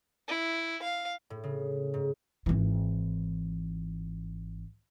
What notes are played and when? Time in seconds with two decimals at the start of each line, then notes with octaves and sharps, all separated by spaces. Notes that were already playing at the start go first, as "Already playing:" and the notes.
0.28 E4
0.82 F5
1.30 A2
1.44 C#3
1.94 G#2
2.46 G#1 E3